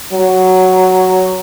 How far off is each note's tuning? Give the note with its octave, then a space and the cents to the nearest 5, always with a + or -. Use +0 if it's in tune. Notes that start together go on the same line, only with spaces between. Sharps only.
F#3 +5